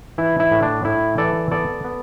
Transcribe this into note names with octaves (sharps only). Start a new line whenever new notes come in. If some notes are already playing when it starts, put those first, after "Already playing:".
E3 E4
E4
A2
D4
A2 E4
E3 A4 D5
B3 A4 D5
B3